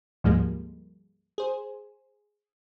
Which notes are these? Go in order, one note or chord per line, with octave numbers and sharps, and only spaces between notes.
D2 G#2 F3 G3 G#3 A#3
G#4 C5